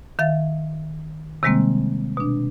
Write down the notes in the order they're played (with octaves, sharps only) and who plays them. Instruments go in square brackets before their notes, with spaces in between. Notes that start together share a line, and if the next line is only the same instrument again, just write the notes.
[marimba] D#3 E5 F5 A6
C3 D#3 G3 G#3 A#3 C4
B2 D4